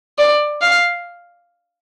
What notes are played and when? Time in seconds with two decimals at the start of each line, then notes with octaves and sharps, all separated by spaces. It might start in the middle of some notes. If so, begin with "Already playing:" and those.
0.18 D5
0.62 F5